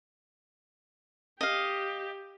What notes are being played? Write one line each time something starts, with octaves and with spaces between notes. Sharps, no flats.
G4 D#5 F5